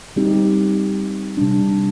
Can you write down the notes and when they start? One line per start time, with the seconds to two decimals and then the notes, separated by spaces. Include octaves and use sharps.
0.16 G3 C4 D#4 G4
1.37 C3 G3 D4